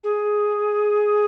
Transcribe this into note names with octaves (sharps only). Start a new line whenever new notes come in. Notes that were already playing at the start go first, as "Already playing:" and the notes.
G#4